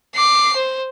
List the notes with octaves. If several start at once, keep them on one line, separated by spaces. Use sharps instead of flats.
D6 C7
C5